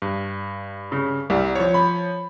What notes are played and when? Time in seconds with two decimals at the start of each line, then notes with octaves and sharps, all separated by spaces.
0.02 G2
0.92 C#3
1.30 C2 G3
1.55 F3 C#5
1.74 B5